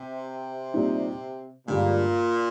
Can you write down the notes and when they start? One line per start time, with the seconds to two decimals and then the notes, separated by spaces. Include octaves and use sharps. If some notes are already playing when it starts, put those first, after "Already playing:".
Already playing: C3
0.74 A#2 G3 C4 D#4
1.67 G2 A#2 D3 G#3